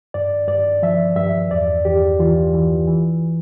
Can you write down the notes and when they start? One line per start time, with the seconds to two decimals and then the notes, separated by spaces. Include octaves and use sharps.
0.14 G2 D5
0.48 G2 D5
0.83 F3 E5
1.16 G2 E5
1.51 E2 D5
1.85 E2 G4
2.19 E3 F4
2.53 E3
2.87 E3